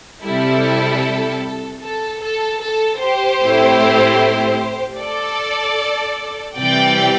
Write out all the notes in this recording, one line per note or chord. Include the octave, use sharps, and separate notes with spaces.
C3 G3 E4 A4
A4
A4
A4
G4 C5
A2 A3 C4 E4
A4 D5
C3 E3 G3 D5 G5